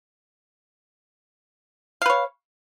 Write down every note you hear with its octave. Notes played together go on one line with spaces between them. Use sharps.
B4 C#5 F5